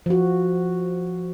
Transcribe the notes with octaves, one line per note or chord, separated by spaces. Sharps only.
F3 F#4